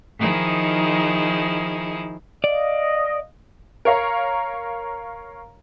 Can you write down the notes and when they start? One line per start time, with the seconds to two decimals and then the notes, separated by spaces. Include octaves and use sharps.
0.19 D#3 F3 D#4 E4 G#4
2.44 D5 D#5 F5
3.85 A#4 C#5 F5 A#5